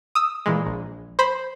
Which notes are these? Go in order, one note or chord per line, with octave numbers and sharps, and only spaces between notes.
D#6 E6
A#2 E3 G#3
A#1
C5 B5